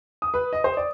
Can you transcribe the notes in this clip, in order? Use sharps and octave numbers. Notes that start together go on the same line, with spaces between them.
D#6
B4
D#5
C5
D5